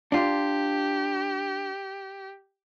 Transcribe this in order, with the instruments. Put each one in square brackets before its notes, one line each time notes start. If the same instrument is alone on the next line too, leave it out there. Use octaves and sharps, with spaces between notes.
[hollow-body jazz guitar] D4 F4 [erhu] G4